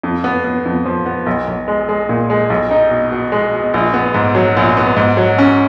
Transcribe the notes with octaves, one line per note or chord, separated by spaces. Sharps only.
F2
B3
B3
F2
F3
B3
B1
B1
G#3
G#3
A#2
G#3
B1
D#4
B2
B2
G#3
B2
A#1
B3
G#2
F#3
A#1
B3
G#2
F#3
C#4